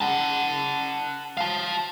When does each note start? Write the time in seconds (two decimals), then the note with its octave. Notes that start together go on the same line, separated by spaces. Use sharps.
0.01 F#5 A5
1.37 F5 A5